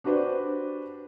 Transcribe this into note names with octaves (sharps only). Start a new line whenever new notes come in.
D4 F#4 G4 B4 C5 D5